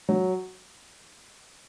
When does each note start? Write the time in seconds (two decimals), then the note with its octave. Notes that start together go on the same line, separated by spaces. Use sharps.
0.09 F#3